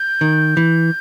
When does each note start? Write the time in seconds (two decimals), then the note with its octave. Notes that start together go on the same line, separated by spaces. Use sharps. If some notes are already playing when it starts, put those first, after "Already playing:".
Already playing: G6
0.21 D#3
0.57 E3